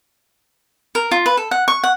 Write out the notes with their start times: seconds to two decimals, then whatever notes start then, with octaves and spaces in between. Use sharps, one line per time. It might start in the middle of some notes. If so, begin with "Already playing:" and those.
0.95 A#4
1.11 F4
1.26 B4
1.37 A4
1.51 F#5
1.68 C#6
1.84 F#5